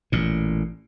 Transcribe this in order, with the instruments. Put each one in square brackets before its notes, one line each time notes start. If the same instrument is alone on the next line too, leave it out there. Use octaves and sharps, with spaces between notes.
[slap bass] A1 A#2